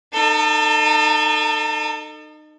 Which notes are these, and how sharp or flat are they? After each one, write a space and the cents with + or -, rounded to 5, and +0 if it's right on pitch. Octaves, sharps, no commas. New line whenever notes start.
D#4 -30 A4 +25